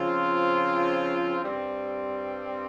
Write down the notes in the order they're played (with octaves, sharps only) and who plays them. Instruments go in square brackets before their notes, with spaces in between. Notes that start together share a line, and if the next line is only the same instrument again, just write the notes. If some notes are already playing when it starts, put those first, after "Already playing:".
Already playing: [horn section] C#3 F3 C4 F4
G2 G3 C4